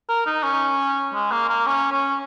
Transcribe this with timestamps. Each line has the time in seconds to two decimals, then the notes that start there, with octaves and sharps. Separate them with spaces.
0.09 A#4
0.26 D#4
0.43 C#4
1.14 G#3
1.31 A#3
1.49 A#3
1.66 C#4
1.92 C#4